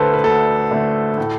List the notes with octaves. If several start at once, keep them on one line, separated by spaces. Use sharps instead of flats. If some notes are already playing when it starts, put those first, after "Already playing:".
Already playing: D2 D3 A3 A4 B4 C5 D5
B4
D2 A4
D3 A3
A2